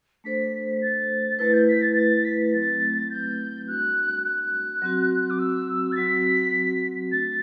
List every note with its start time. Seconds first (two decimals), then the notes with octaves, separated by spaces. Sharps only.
0.24 A3 D4 A4 C5 B6
0.81 A6
1.39 A3 E4 B4 A6
1.53 G6
1.67 B6
1.81 A6
1.95 A6
2.24 B6
2.52 F#3 A3 C4 A6
3.09 G6
3.67 G3 D4 F#4 F#6
4.24 F#6
4.82 F#3 C4 F#4
5.30 D6
5.38 E6
5.91 A6
5.96 F#3 C4 F#4 B6
7.11 A3 D4 F#4 A6